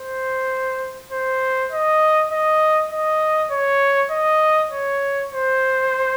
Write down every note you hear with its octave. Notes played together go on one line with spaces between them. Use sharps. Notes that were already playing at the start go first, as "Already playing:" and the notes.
Already playing: C5
C5
D#5
D#5
D#5
C#5
D#5
C#5
C5